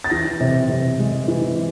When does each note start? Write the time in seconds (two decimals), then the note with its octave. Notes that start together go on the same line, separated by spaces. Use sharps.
0.04 A6
0.10 E3 A#6
0.41 C3
0.70 C3
0.99 G#3
1.28 E3